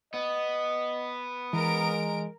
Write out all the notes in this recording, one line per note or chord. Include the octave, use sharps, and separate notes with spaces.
B3 D#5
E3 G#3 A#4 D7